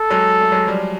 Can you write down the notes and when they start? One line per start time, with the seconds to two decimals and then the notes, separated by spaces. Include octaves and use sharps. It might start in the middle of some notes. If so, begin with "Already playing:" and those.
Already playing: A4
0.10 F#3 G#3
0.41 A3
0.52 F#3 G#3
0.67 F3 G3